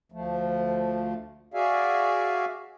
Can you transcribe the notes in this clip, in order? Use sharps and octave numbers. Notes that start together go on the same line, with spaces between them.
D2 F3 A3
F#4 G#4 D5 E5 F5 G#5